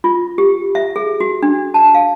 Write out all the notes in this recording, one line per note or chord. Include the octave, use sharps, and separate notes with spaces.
F4
G4
E5
G#4
F#4
D4
A5
F5